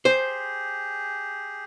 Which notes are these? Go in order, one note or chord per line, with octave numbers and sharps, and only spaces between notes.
G4 G#4 C5